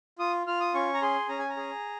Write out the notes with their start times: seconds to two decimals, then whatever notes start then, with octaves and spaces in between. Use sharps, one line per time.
0.19 F4 D#6
0.47 F4 F6
0.60 D#6
0.74 C#4 C#6
0.94 A#5
1.02 G#4 C6
1.29 C#4 A#5
1.39 G#5
1.49 A#5
1.57 G#4